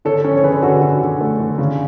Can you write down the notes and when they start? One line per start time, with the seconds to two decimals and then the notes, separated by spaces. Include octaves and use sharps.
0.05 D3 A4 C#5
0.24 C#4
0.37 C#5
0.43 D3 G#4 B4
0.62 D3 F#4 A4
0.82 D3 F#4
1.01 D3
1.20 A3
1.40 D3
1.58 C#3